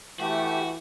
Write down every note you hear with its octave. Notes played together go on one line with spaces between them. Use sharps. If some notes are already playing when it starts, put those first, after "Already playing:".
E3 A3 F#4 G4